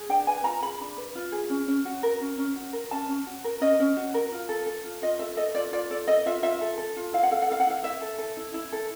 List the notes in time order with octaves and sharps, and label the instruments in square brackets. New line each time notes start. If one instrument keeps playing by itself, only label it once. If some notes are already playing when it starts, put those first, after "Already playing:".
Already playing: [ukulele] G#4
D4 G5
B4 G#5
F4 A#5
G#4 B5
D4
B4
F4
G#4
C#4
C#4
F#4
A#4
C#4
C#4
F#4
A#4
C#4 A5
C#4
F#4
A#4
C#4 D#5
C#4
F#4
A#4
F4
A4
A4
F4
F4 D#5
A4 E5
A4 D#5
F4 D5
F4 D5
A4 D5
A4 D#5
F4 E5
F4 E5
A4
A4
F4
E4 F5
F#5
A4 F5
F#5
A4 F5
F#5
E4 F5
E4 E5
A4
A4
E4
E4
A4